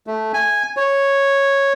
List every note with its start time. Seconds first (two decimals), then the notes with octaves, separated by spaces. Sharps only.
0.07 A3
0.34 G#5
0.77 C#5